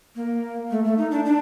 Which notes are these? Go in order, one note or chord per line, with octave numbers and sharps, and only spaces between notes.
A#3
A3
A3
D#4
D4
D4